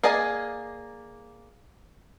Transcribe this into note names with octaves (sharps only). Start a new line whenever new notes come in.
A#3 G#4 D5 D#5 G#5